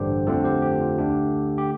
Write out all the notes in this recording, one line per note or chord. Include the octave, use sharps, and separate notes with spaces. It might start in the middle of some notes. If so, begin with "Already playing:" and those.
Already playing: A1 G2 D3 G3 G4 C5
F2 D3 A3 C4 F4 A4
G4 C5
G4
F4
D2 D3 A3 D4 G4
G4